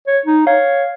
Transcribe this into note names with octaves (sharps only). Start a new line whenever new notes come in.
C#5
D#4
C#5 F5